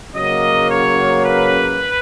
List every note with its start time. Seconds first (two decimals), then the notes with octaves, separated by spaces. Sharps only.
0.13 C#3 F#3 A#3 D#5
0.69 C#5
1.23 B4